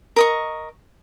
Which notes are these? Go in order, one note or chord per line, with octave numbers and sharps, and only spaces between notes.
A#4 D#5 C#6